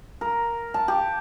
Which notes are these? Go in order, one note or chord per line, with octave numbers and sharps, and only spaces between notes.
A#4
A5
G4